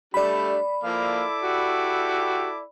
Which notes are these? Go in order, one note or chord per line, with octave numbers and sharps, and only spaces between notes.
G3 A3 D4 D5 B5
F3 A#3 E4 A4 F5 D6
F#4 G4